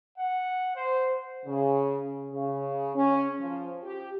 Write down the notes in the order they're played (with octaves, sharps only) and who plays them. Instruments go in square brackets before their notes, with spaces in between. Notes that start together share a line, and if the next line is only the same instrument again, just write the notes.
[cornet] F#5
C5
[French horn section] C#3
C#3
C#4
F3
G4